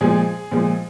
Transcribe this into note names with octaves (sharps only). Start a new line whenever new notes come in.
A#2 F3 G#3 G#4
A#2 F3 G#3